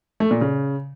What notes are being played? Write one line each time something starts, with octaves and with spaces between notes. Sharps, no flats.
A3
A#2
C#3